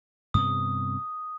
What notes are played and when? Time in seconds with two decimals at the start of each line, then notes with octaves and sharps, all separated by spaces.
0.34 G2 C3 B3 D#6